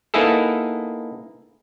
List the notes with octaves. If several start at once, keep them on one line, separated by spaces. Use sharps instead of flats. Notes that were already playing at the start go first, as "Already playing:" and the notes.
A#3 B3 D#4 E4 G#4 A4